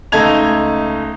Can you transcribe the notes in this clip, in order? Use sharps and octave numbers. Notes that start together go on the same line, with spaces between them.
C#2 A3 D#4 A5 G#6 F7